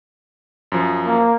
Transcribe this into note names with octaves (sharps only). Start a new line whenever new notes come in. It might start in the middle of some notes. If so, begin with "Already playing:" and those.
F#2 F3
A#3